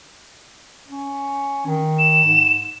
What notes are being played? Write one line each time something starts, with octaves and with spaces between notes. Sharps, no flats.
C#4
D#3
E7
G#2